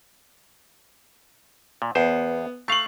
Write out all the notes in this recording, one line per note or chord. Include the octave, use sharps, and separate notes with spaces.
A#2
E2 B3 C5
A3 F5 C#6 F#7